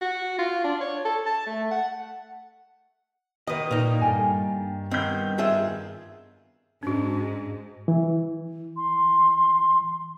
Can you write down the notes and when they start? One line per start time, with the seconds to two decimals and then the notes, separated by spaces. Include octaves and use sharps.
0.01 F#4
0.38 F4
0.64 D4
0.81 C#5
1.05 A4
1.26 A5
1.46 A3
1.71 F#5
3.47 D#3 B4 D#5 D#6
3.71 A#2 A#3 D#4 D5
4.01 G2 A4 G5 G#5
4.91 D#3 B3 C4 G6
5.38 F4 G#4 E5
6.83 G#2 C#4 D4 F#4
7.88 E3
8.76 C6